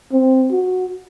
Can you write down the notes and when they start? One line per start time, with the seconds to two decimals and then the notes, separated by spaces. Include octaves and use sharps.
0.13 C4
0.51 F#4